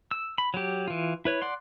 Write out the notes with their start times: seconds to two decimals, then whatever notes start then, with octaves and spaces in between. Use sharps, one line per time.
0.11 E6
0.38 B5
0.54 F#3 G4
0.88 E3 F4
1.25 E4 B4 C#5
1.42 D5 F#5 C6